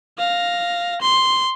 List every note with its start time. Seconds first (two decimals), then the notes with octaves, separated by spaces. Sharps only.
0.18 F5 A#6
1.01 C6